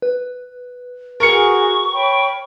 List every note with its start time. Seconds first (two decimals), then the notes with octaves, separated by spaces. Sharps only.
0.02 B4
1.20 F#4 G#4 A#4 C#6 C#7
1.92 C#5 G5 B5